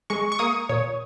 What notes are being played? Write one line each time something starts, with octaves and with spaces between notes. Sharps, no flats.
G#3 C#6
C#6
A#3 D#6
A#2 C#5